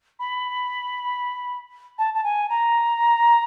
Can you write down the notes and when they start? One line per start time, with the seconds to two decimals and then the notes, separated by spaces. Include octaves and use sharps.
0.19 B5
1.98 A5
2.13 A5
2.23 G#5
2.49 A#5